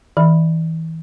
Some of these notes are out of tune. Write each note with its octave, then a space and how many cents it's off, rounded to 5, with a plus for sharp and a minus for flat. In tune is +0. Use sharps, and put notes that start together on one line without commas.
E3 -30 E5 +5 B5 +0